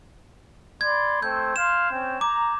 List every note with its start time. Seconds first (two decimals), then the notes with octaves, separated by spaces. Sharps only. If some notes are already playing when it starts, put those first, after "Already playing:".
0.81 D5 B5 C6 G#6
1.22 A3 C4 C5 G6
1.56 F5 C6 E7
1.91 C4 C#4
2.21 A#5 D6